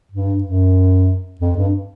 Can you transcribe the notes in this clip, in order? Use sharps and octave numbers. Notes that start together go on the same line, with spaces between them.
G2
F#2
F2
G2